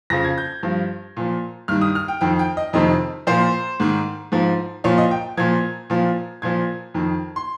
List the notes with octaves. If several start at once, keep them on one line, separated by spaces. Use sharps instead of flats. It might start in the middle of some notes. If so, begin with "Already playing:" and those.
F2 C#3 F3 A#6
G#6
G6
G2 F3
A#2 F3
G2 D#3 F6
D#6
F6
G5
F2 D#3 G5
G5
D#5
F2 C3 D#3 D#5
A#2 F3 C5
G#2 D#3
G#2 F3
A#2 F3 C#5
D#5
G5
A#2 F3 G#6
A#2 F3
A#2 F3 G#6
F2 D#3
C6